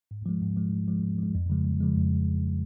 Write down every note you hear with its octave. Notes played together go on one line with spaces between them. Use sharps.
G#2
F3 G#3
G#2
F3 G#3
G#2
F3 G#3
G#2
F3 G#3
F2
C#3 F3 G#3
F2
C#3 F3 G#3
F2